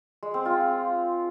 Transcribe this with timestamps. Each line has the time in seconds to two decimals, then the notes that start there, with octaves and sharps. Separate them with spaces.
0.23 G#3
0.34 C4
0.46 F4